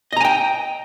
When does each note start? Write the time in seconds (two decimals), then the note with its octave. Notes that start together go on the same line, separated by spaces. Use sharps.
0.13 D#5
0.17 A#5
0.21 G#5
0.25 G5